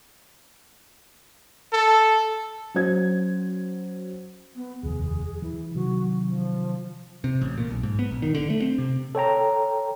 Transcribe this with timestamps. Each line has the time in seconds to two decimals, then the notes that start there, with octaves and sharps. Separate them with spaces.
1.73 A4
2.74 F#3 C#4 F#4 C5 G#6
4.56 B3
4.83 F1 D#2 F3 G#4
5.42 E3 E4
5.75 C3 D#3 F#3 F#4
6.27 F3
7.24 C3
7.42 A1
7.58 A#2
7.71 B1
7.83 G#2
7.99 B3
8.11 A#1
8.22 D#3
8.35 D3
8.50 A3
8.62 C4
8.78 C3
9.15 A4 C#5 G5 A#5